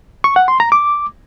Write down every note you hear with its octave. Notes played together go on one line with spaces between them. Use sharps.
C#6
F#5
C6
A#5
D6